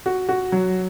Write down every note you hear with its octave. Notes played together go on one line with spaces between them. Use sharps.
F#4
F#4
F#3